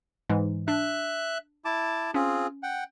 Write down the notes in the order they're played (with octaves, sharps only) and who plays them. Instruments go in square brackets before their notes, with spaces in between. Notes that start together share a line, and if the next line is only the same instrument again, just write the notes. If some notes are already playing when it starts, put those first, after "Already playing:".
[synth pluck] G#2 E3 G#3
[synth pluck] D4 [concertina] E5 F#6
[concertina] E4 A5 D6
[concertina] C4 F4 G#4 [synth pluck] C#4
[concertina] F#5 G5